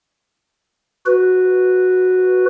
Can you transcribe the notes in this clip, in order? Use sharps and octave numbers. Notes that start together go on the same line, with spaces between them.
F#4 B4